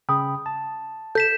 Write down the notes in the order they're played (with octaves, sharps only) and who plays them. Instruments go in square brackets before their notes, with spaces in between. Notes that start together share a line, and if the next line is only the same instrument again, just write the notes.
[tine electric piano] C#3 G5 B5 [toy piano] D#6
[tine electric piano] A5
[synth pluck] A4 [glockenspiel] G6 B6 E7